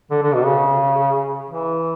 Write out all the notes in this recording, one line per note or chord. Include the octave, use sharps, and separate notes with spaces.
D3
D3
B2
C#3
E3